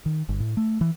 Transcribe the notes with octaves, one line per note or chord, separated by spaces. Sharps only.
D#3
G1
A2
A3
E3